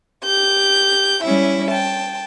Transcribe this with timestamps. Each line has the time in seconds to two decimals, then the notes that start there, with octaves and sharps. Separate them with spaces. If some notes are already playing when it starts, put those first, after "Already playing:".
0.24 G4 G6
1.23 G3 C#4 E4 E5
1.69 G5 A5